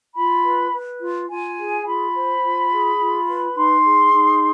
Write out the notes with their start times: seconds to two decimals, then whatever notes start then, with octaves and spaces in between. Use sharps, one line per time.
0.16 F4 B5
0.44 B4
0.72 B4
1.00 F4
1.29 F4 G#5
1.57 G#4
1.86 F4 B5
2.15 C5
2.43 F4
2.71 G#4
2.99 F4
3.28 B4
3.56 D#4 C6
3.85 G#4
4.13 D#4